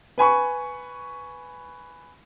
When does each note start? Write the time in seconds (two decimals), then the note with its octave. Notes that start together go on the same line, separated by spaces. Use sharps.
0.18 B4 G#5 B5 C#6